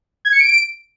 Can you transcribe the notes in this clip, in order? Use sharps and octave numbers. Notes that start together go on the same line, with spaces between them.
G#6
C#7
D7